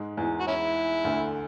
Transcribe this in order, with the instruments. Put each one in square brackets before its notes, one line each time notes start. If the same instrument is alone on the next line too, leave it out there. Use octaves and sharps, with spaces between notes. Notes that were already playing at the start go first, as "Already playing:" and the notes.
Already playing: [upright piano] G#2 G#3
E2 E3
[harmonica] F#4
C#4 E4
[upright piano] D2 D3